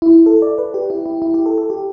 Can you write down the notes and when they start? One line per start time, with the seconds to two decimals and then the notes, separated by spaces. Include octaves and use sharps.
0.02 E4
0.26 A4
0.42 D5
0.58 B4
0.74 G4
0.90 E4
1.06 E4
1.22 E4
1.34 G4
1.46 A4
1.58 A4
1.70 G4